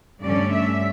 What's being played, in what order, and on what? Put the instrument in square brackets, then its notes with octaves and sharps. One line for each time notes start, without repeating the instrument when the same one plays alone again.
[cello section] G2 D3 A3 C#4 D5
E5